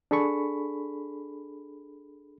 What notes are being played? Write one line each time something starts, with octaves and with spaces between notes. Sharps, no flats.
D4 G#4 A4 B5 C#6